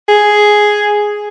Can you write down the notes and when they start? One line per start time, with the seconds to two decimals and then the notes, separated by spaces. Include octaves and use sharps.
0.09 G#4